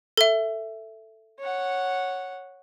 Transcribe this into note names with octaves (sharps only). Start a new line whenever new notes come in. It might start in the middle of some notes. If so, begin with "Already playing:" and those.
A4 E5
C#5 F#5